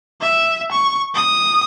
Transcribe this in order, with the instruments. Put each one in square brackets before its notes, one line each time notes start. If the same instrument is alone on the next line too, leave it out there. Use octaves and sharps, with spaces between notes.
[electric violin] E5
C#6
D#6